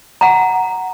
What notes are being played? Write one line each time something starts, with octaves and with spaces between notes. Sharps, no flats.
F#5 A#5